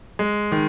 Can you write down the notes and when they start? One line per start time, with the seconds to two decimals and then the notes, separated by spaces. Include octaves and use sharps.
0.19 G#3
0.52 D#3